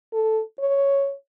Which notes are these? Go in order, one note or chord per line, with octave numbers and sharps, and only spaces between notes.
A4
C#5